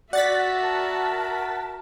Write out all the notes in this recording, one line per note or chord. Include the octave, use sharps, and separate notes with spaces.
F#4 D5 E5 F#5 A6 B6
A#4 A5